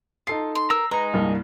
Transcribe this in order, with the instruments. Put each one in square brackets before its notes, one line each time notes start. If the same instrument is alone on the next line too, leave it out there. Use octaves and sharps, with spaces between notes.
[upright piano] D#4 A4 C7 [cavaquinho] F4
[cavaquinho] C6
[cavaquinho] A#4 [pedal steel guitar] A#5 E6
[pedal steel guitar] G#3 D#4 [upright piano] B4 [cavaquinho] A#5
[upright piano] C2 G2 A#3